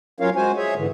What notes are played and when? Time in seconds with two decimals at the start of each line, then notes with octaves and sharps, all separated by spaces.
0.20 F#3 C#4 F4 A#4 C#5 F5
0.36 G#3 F#4 C5 G#5
0.56 G#4 C#5 E5
0.76 G#2 D3 E3